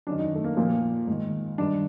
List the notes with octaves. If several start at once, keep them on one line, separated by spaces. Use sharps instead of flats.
F#2 D#3 D4
D#4
A3
A#3
A#2 F3 A#3
G#2 D#3
G2 D#3 D4